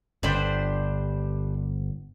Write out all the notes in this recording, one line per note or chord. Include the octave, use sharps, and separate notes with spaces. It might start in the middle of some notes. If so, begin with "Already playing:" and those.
G1 G3 D4 C5